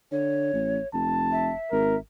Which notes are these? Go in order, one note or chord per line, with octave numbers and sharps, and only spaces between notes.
D3 C#5
A1
F1 A5
E5
G#1 A#4